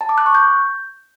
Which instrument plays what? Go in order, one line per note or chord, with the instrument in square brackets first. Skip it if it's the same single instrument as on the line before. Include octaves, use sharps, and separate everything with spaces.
[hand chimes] A5
D6
F#6
C#6
G6